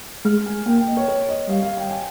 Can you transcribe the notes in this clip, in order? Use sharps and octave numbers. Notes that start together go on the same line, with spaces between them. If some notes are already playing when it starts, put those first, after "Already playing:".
G#3 F6
G#5
A#3 G5
G5
D#5
C#5
C#5
D#5
G3 F5
F5
G5
G#5